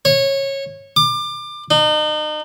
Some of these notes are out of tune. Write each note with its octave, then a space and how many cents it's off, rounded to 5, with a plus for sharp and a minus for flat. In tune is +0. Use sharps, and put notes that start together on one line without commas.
C#5 -20
D6 +25
D#4 -35